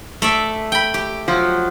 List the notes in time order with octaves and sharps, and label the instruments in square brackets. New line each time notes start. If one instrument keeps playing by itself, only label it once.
[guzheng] A3 D5 E5
G5 B5
G4
[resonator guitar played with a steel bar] F3 F#3